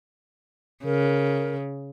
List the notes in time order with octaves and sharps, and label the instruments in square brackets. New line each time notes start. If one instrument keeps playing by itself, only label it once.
[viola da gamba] C#3 [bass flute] A#4